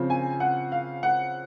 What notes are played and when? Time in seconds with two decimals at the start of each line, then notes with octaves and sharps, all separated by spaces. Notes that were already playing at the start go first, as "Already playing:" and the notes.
Already playing: C#3 F3 C4
0.10 G#5
0.40 F#5
0.72 F5
1.03 F#5